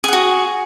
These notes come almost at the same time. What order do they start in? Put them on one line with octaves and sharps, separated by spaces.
G#4 F#5 F#4